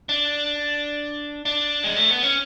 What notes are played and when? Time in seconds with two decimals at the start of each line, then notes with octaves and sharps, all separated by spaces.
0.09 D4
1.45 D4
1.84 G#3
1.96 A3
2.10 B3
2.23 C#4